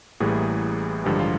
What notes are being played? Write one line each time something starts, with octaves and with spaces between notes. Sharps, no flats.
A1 A2 E3 G3 A#3 G#4
A1 G2 D3 F3 G#3 G4
F4